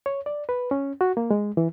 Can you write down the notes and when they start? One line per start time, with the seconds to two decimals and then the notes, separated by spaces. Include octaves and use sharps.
0.06 C#5
0.26 D5
0.49 B4
0.71 C#4
1.01 F#4
1.17 A#3
1.31 G#3
1.57 E3